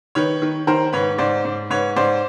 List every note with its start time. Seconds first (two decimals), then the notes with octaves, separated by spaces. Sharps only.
0.15 D#3 B4 C#5
0.42 D#3
0.67 D#3 A#4 C5
0.93 G#2 B4 C#5
1.18 G#2 C5 D5
1.45 G#2
1.70 G#2 B4 C#5
1.96 G#2 C5 D5